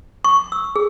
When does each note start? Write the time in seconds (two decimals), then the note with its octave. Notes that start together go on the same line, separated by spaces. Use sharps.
0.24 C#6
0.52 E6
0.76 G#4